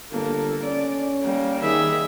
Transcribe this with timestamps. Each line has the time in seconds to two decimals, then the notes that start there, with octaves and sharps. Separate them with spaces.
0.11 G1 A#3 A4
0.64 C#4 D5
1.22 G3 A#3
1.62 D#3 G#4 E5